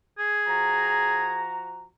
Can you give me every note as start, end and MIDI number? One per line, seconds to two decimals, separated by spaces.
0.18 1.41 68
0.48 1.90 53
0.48 1.90 66
0.48 1.90 82